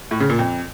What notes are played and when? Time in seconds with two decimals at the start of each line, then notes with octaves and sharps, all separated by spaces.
0.11 A2
0.20 C#3
0.30 A#2
0.39 F2